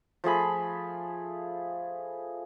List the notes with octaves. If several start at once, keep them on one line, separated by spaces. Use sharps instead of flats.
F3 A3 G#4 B5